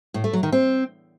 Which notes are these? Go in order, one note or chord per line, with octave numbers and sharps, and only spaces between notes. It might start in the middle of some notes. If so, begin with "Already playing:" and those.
A2
A3
F#3
D#3
C4